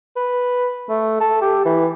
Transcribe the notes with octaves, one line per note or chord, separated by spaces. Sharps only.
B4
A3
A4
G4
E3